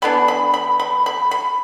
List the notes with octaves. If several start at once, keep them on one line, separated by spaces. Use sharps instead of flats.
E3 B3 D4 B5
B5
B5
B5
B5
B5